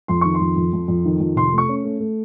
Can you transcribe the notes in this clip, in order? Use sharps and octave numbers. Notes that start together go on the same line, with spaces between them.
F2 C6
D#3 C#6
C6
F2
F2
F2
F2
D#3
F2
C3 C6
A3
C#6
C#4
A3
A3